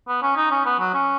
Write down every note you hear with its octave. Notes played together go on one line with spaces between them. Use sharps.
B3
C#4
D#4
C#4
B3
F#3
C#4